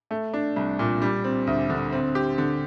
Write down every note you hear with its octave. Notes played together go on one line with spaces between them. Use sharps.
A3
D4
C2
A#2
G3
C4
D2
D3
C4
G4
D3